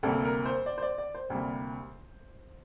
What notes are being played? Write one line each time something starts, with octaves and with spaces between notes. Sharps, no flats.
D2 C3 G3 A#3 A4
A#4
C5
D5
C5
D5
D5
C5
D2 C3 G3 A#3